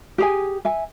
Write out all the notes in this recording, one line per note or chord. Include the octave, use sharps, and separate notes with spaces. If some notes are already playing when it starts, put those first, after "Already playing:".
G4 G#4 G#5
E5 G#5